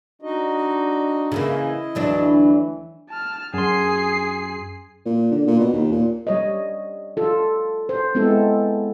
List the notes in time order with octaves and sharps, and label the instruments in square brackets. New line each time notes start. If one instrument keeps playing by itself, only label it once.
[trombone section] D4 [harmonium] D#4 F#4 D#5
[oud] C#3 E3 A#3 [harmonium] E4 D#5
[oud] D2 F#3 D4 [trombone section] E3
[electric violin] A5 F6
[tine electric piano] F#2 C6 [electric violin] G#4 C7
[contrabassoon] A#2
D3
A#2
B2
D#2
A#2
[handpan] G3 C#5 D#5
F4 A4
C5
G#3 B3 C4 E4 A4